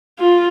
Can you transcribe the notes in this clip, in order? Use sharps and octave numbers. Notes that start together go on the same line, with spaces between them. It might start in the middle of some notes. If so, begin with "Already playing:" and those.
F4